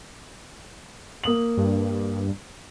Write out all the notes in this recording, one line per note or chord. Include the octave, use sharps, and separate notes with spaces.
A#3 D#6 F#7
G2